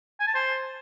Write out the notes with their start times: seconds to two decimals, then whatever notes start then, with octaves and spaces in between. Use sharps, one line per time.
0.20 G#5
0.27 A5
0.34 C5